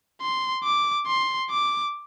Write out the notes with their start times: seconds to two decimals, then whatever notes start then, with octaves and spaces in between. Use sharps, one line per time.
0.22 C6
0.64 D6
1.07 C6
1.51 D6